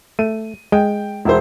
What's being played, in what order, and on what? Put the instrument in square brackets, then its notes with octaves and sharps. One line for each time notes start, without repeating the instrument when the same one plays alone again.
[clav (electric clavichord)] A3 [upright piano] D#7
[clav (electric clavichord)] G#3 [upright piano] G5
[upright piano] E1 E4 C5